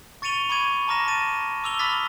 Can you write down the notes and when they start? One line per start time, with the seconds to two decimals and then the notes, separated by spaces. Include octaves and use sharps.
0.22 C#6 A6 C#7 D#7 F7 G7
0.50 B5 C#6 D6 G#6 D#7
0.87 A5 A#5 D6 F6 A#6 E7
1.08 A6 D#7
1.64 D6 E6 F7 G7
1.79 B5 D6 D#6 F6 A6 B6